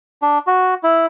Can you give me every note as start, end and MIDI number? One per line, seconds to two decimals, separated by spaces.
0.22 0.38 62
0.47 0.74 66
0.83 1.06 64